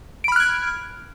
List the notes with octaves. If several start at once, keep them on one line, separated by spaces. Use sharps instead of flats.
B5 F6 F#6 G#6 D7